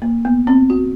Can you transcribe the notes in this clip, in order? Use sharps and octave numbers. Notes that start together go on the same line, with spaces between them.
A#3
B3
C4
F#4